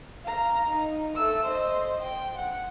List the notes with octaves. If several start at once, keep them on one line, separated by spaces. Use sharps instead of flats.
F5 A#5
D#4
A3 E6
C5 D#5
G5
F#5